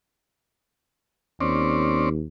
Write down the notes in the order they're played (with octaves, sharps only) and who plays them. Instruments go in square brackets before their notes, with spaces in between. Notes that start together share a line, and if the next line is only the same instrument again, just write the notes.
[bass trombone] D#2 [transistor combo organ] C4 C#4 D5